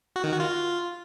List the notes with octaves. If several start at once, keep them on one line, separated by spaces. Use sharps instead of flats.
F#4
D#3
F#4
F4